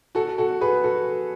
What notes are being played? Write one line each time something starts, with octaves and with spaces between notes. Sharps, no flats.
F#4 A4
F#4 A4
G#4 B4
F#4 A4